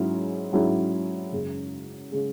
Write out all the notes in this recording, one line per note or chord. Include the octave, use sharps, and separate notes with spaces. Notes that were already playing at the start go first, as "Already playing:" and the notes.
Already playing: G#2 F#3 C#4 E4 G#4
G#2 F#3 C#4 E4 G#4
F#2 C#3 G#3
C#3 G#3